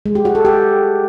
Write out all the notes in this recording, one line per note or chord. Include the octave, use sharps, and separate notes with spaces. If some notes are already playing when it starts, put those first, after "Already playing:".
G#3
G4
F#4
A4
G4